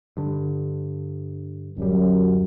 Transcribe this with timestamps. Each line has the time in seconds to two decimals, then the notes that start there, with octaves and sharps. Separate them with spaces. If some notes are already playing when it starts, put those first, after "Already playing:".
0.17 G2 D3
1.78 D1 F#2 G3